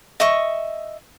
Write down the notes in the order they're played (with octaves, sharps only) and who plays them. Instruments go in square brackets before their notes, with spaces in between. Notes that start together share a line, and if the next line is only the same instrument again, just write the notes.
[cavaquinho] D#5 E5 C#6